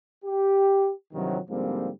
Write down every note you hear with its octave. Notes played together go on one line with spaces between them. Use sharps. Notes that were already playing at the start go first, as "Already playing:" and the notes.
G4
G2 C3 D#3 F3 F#3
G#2 D3 F3 G3 A#3 C4